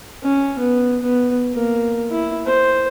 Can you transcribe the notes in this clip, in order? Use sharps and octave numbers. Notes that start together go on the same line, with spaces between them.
C#4
B3
B3
A#3
E4
C5